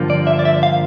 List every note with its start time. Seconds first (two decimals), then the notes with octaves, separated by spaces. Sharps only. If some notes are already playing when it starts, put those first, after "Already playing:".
Already playing: G2 D3 F3 A#3
0.10 D5
0.27 E5
0.39 D5
0.45 E5
0.63 F5